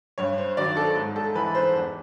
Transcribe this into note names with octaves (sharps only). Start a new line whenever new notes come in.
G2 C#5
C5
D#3 F#3 D5
A4
G#2
A4
E3 B4
C5
E2